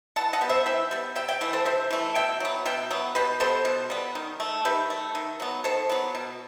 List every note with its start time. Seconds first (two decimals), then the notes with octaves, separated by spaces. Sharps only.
0.16 E3 F#5 A5
0.33 D#5 F#5
0.41 G3 B3
0.49 C5 E5
0.66 E3 E5 G5
0.91 G3 B3
1.16 C3 E5 G5
1.28 E5 G5
1.41 E3 A3
1.53 A4 C5
1.65 C3 C5 E5
1.91 E3 A3
2.15 B2 E5 G5
2.40 F#3 B3
2.65 B2 E5 G5
2.91 F#3 B3
3.15 B2 G4 B4
3.40 G3 B3 A4 C5
3.65 B2
3.90 G3 B3
4.15 D#3
4.40 A3
4.65 D#3 G4 B4
4.90 A3
5.15 D#3
5.40 F#3 B3
5.64 D#3 A4 C5
5.89 F#3 B3
6.15 B2